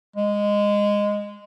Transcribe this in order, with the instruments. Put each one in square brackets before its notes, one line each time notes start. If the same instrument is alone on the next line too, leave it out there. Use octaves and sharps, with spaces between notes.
[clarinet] G#3